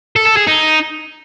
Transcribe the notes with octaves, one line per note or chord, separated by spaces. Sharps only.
A4
A4
G#4
D#4